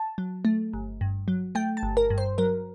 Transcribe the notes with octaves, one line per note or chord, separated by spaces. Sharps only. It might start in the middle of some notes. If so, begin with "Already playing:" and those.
Already playing: A5
F#3
A3
G1
G2
F#3
A3 G5
A5
G1
A#4
G2
C5
F#3 A#4